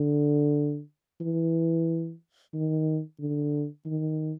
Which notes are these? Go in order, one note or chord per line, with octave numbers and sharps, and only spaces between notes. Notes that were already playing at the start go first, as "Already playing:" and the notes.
Already playing: D3
E3
D#3
D3
D#3